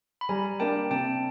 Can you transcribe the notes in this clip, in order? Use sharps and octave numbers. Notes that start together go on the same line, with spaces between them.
B5
G3 G#5 A#5
A#3 D4 G5 A5
C3 G5 A5